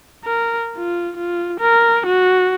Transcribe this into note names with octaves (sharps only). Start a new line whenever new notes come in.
A#4
F4
F4
A#4
F#4